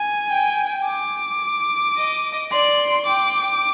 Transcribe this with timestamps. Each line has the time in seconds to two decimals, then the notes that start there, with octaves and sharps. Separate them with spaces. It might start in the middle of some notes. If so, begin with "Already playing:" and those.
Already playing: G#5
0.30 G5
0.85 D6
1.96 D#5
2.51 D5 C6
3.06 G5 D6